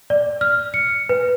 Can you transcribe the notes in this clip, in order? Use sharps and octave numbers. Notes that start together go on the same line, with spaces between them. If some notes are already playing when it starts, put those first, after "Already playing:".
D5
F6
C#7
B4